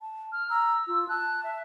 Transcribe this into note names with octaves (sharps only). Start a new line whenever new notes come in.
A5
F6
A#5 E6
F4
A5 F#6
E5